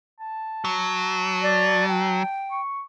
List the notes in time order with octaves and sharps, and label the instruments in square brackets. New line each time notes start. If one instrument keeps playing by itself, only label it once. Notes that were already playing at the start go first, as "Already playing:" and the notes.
[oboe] A5
[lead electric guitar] F#3
[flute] D5
G5
[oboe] C#6